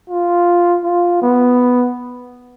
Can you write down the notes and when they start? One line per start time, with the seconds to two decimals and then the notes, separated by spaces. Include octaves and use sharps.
0.10 F4
0.84 F4
1.22 B3